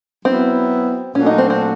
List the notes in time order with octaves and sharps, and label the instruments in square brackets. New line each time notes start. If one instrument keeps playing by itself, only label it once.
[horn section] F#3 B3 E4 [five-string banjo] C4
[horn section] A#2 F#3 A3 D4 F#4 [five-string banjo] C#4
[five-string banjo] D#4
C4
C4